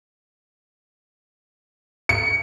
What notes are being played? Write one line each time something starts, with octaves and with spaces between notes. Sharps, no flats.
C#7